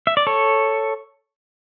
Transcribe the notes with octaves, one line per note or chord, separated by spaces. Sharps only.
E5
D5
A4 C#5